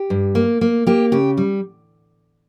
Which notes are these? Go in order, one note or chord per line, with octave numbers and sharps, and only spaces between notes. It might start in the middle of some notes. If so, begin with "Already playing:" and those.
Already playing: G4
G2
A#3
A#3
A#3 G4
C#3 G4
G3